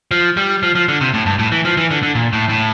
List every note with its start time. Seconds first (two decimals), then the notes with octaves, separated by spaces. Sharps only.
0.11 F3
0.37 G3
0.63 F3
0.75 F3
0.88 D3
1.01 C3
1.14 A2
1.26 G2
1.39 A2
1.52 E3
1.65 F3
1.77 E3
1.91 D3
2.03 D3
2.15 A#2
2.33 A2
2.49 A2